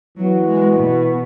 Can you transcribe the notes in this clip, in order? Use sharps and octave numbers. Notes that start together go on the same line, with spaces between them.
E3 F#3 B3 F#4
G#3
B2